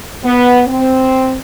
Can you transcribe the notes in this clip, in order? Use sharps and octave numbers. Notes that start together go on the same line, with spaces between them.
B3
C4